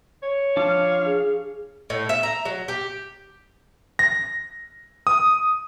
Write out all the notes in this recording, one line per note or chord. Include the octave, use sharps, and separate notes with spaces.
C#5
F3 D4 F5 D6
G#4
A2
E5
A#5
F#3
G4
A#6
D#6